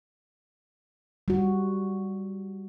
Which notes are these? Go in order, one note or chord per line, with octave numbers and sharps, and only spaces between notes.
G3 F#4